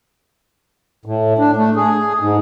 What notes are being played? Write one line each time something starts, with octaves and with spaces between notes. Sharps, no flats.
A2
D4
A3
G#4
G#2